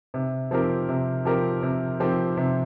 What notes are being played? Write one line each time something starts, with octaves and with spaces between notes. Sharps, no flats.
C3
F3 C4 G4 A#4
C3
F3 C4 G4 A#4
C3
F3 C4 G4 A#4
C3